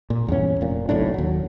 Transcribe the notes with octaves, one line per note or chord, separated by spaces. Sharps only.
A#2
E2 G2 C#4
F1 A#2
F#1 B1 A2 D4
D#2 F#3